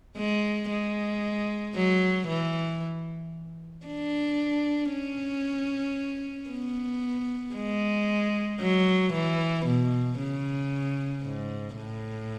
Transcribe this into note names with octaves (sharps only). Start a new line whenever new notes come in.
G#3
G#3
F#3
E3
D4
C#4
B3
G#3
F#3
E3
B2
C#3
G#2
A2